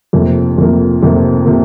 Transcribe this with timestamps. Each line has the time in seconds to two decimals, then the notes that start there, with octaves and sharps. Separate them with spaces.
0.13 F1 F2 C3 F3 A#3
0.57 F1 F2 C3 F3 A#3
1.02 F1 F2 C3 F3 A#3
1.46 C3 F3 A#3